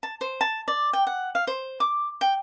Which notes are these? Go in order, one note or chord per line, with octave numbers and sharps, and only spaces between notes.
A5
C5
A5
D5
G5
F#5
F5
C5
D6
G5